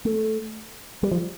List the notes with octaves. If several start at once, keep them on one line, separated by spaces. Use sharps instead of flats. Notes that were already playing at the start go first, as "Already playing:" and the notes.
A3
G3
F3